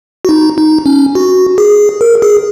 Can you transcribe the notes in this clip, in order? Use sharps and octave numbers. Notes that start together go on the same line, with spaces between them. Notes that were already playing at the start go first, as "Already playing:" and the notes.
F#4
D#4
D#4
C#4
F#4
G#4
A#4
G#4